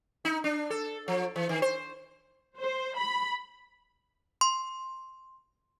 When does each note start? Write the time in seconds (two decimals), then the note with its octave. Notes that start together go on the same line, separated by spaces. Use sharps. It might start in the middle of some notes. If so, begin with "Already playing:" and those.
0.25 D#4
0.44 D4
0.70 A4
1.08 F3
1.36 E3
1.49 D#3
1.62 C5
2.58 C5
2.96 B5
4.41 C6